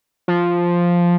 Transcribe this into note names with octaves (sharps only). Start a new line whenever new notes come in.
F3